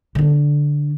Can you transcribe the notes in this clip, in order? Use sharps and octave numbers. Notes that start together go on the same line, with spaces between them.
D3 D4